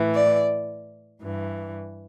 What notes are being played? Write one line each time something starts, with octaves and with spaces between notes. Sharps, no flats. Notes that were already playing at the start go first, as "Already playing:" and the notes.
Already playing: A2 E3
D5
G2 E3